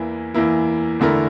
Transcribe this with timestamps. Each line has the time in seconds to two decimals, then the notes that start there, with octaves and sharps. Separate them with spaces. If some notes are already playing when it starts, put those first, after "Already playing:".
Already playing: E2 E3 A#3 E4
0.34 E2 E3 A#3 E4
0.99 E2 D3 A3 E4 A#4